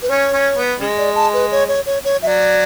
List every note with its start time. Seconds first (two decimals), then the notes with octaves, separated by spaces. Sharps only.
0.02 B4
0.09 C#4 C#5
0.33 C#4
0.57 B3
0.80 C#3 G#3
0.98 D5
1.15 A5
1.33 B4
1.52 C#5
1.68 C#5
1.86 C#5
2.04 C#5
2.21 F#3 E5
2.27 D5